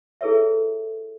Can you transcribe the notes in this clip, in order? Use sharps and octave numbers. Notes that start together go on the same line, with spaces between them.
E4 G#4 A4 B4 C#5 E5